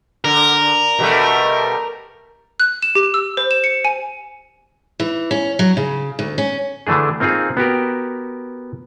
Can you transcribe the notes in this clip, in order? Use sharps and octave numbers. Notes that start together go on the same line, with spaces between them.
D3 A#4
B2 G3 A3
F#6
E7
G4
E6
C5
E7
C#7
G#5
E3
C#4
F#3
C#3
D2
C#4
D3 E3 A3 D4 G#4
A#3 C4 D#4 F4 G#4
B3 F#4 G4 A#4